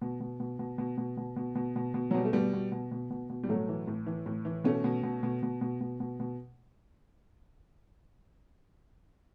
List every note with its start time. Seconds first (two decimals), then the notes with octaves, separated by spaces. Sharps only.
0.01 B2
0.20 B2
0.40 B2
0.59 B2
0.78 B2
0.97 B2
1.17 B2
1.36 B2
1.55 B2
1.76 B2
1.94 B2
2.11 F#3
2.14 B2 G3
2.25 A3
2.33 B2 G3 B3
2.53 B2
2.72 B2
2.91 B2
3.10 B2
3.30 B2
3.43 G3
3.48 A2 F#3 A3
3.68 E3
3.87 A2
4.06 E3
4.26 A2
4.45 E3
4.64 B2 A3 C#4
4.84 B2
5.03 B2
5.23 B2
5.43 B2
5.61 B2
5.81 B2
6.00 B2
6.20 B2